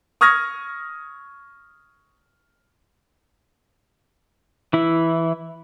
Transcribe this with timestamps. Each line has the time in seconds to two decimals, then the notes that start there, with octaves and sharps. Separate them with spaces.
0.21 C#6 D#6 F6 G#6 A#6
4.73 E3 E4